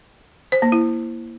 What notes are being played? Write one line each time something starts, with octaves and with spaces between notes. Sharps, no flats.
C5
A#3
E4